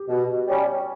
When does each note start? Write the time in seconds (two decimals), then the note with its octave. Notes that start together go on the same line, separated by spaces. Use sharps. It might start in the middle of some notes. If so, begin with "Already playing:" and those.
Already playing: G4
0.09 B2
0.48 G3 C#4